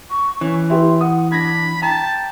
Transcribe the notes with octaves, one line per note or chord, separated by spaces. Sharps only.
C#6
E3 C#4
E4 G4 B4 C6
F#5 D#6
D4 B5 G#6 A#6
G5 A5 A#5